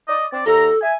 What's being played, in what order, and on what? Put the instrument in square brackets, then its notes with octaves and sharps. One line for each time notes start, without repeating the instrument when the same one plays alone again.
[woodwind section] D5 D#5
C4 D5
[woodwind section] D#2 A#5 [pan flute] A4
[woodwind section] E5 G#5